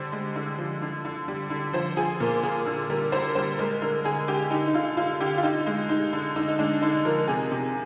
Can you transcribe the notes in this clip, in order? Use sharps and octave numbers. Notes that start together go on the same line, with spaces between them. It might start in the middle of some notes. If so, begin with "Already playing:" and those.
Already playing: D3 G3 C5
G#3
D3
F3
D3
D3
G3
D3
F3 C5
F3 G#4
A#2 A#4
A#2 G#4
D3
G3 A#4
D3 C5
G3 C5
G#3 A#4
D3 A#4
D3 G#4
D3 G4
D3 D#4
D#4
D3 F4
D3 F4
D3 G4
F4
D3 D#4
G#3
G#3 D#4
D3
D3 D#4
D#4
G#3 D4
D3 D#4
F3 A#4
C3 G#4
C3